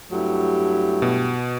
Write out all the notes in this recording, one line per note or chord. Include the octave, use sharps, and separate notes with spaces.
G2 F#3 A3 E4 G4
B2